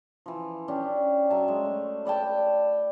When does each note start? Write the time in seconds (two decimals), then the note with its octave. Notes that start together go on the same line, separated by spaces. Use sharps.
0.26 E3 F3
0.68 C#4 D4 G4
1.30 F#3 E5 A5
1.48 G#3
1.65 A3
2.05 B4 D5 G5 A5